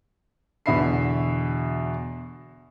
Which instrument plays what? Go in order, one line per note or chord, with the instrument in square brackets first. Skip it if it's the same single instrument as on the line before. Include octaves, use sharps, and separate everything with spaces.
[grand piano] E2 B2 D3 E5 B5 C7